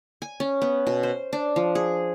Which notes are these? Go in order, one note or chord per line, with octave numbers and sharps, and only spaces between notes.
G#5
C#4
B3
B2
C5
D4
F3
G#4